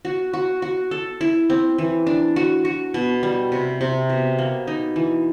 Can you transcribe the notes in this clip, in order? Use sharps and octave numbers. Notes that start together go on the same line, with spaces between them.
F#4
F#4
F#4
A4
E4
C4
E3
D4
F#4
F#4
B2
G3
C3
C3
B2
A#3
D#4
E3